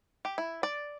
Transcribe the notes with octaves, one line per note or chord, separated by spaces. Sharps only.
G4
E4
D5